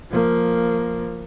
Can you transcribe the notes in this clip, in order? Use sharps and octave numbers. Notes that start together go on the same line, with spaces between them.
F3 A#3